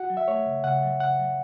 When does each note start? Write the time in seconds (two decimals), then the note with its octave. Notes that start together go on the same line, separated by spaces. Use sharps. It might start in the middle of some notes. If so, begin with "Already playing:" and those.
Already playing: F#4 F#5
0.10 F#3
0.17 E5
0.28 A3 C#5
0.46 C#3
0.64 C#3 F#5
0.83 F#3
1.00 C#3 F#5
1.19 F#3